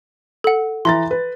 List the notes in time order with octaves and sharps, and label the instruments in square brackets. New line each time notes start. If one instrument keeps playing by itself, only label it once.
[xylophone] A4 F#5
[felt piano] E3 A#5 A6 [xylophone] C6
[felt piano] B4